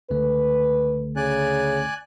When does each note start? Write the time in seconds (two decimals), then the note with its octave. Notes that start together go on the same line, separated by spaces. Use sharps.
0.10 C#2 D3 A3 B4
1.16 C#3 D5 G#5 F#6